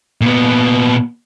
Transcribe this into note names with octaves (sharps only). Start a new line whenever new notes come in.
A#2 B3